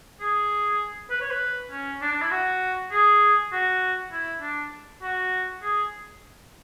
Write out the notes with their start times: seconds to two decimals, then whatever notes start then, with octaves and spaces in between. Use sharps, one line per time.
0.20 G#4
1.10 B4
1.21 C#5
1.30 B4
1.71 C#4
2.02 D4
2.12 D4
2.22 E4
2.31 F#4
2.92 G#4
3.52 F#4
4.12 E4
4.42 D4
5.02 F#4
5.62 G#4